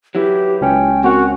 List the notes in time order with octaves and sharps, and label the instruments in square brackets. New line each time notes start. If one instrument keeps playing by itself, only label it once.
[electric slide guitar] F#3 E4 B4 [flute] G4
[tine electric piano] C#2 C#4 [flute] G5
[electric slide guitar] C4 A#4 C#5 [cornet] F#4 [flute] F#5